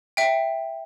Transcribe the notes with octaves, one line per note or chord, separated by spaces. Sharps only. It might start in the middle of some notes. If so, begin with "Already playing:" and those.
E5 G5